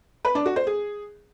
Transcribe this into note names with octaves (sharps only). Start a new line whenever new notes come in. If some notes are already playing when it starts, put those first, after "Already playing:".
B4
D4
F#4
C5
G#4